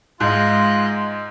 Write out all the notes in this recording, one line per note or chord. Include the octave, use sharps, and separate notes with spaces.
G#2 G#3 F4 D#5 F#6